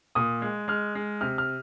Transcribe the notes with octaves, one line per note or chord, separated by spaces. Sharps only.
A#2 D#6
G#3
G#3 F6
G#3
C3 F6
F6